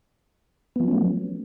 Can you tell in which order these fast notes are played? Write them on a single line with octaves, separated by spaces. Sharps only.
B3 F3 F#3 C#4 A3